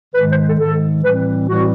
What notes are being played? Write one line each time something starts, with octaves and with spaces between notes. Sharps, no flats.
G#2 D#3 G#3 B4
C5
A4
G#2 D#3 G#3 A4
A2 E3 G3 C4 B4
A2 E3 G3 C4 F#4